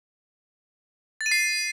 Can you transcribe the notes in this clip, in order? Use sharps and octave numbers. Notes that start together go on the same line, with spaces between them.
A6
D#7
C7